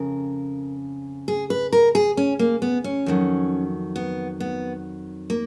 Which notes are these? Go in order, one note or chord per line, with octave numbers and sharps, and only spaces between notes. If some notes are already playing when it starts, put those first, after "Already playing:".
Already playing: F2 C#3 A#4
G#4
B4
A#4
G#4
C#4
A#3
B3
C#4
F2 D#3 F#3
B3
B3
A#3